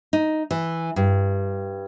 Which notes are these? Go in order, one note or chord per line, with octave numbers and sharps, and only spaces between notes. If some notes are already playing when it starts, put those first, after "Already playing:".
D#4
E3
G2